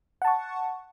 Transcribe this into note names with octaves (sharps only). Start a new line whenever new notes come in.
F#5 A5 C#6